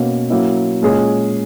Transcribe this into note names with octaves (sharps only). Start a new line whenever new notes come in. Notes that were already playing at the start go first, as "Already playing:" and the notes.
Already playing: B2 A#3 C#4
F#3 A#3 C#4 E4
A#2 G#3 C#4 G#4